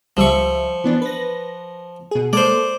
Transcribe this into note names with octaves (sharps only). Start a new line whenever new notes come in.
C#2 F3 G3 E5 C#6
E3 B3 D4
B4 A#6
B2 G#4
G#3 A#3 A4 C5 D5